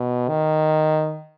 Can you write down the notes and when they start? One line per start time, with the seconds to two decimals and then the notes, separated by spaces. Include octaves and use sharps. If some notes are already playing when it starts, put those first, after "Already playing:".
Already playing: B2
0.29 D#3